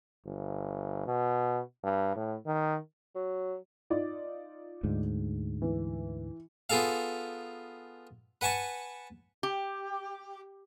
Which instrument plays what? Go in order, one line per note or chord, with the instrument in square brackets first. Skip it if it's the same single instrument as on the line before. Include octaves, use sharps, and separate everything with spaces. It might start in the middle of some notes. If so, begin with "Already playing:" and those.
[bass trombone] G1
B2
G2
A2
D#3
[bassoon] F#3
[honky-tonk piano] D#4 F4 D5
[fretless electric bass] D2 G#2
[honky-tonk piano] E3
[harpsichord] B3 F4 G#4 A4 F5
B4 F#5 G#5 A5 C#6
[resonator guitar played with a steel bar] G4